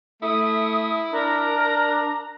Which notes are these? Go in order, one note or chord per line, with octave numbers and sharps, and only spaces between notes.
A3 E4 D#6
D4 A#4 A#5